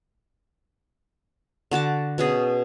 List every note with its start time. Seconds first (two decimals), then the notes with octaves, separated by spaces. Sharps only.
1.71 D3 F#4 A5 D6
2.18 B2 C#4 G#4